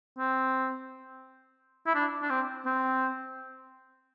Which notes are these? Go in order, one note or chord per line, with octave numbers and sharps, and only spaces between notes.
C4
E4
D4
D4
C4
C4